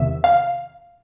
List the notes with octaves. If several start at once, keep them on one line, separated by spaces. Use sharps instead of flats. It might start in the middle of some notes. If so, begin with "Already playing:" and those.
Already playing: E2 C3 D#3 E5
F5